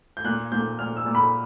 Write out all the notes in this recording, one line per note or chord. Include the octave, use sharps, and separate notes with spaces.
G6
A#2 F#6
A#2 G6
A#2 F6
E6
A#2
B5